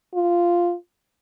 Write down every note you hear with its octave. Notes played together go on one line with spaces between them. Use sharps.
F4